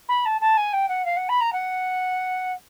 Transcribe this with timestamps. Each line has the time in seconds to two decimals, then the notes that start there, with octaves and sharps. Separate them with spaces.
0.08 B5
0.25 A5
0.41 A5
0.57 G#5
0.73 G5
0.89 F#5
1.05 F5
1.16 F#5
1.29 B5
1.40 A#5
1.53 F#5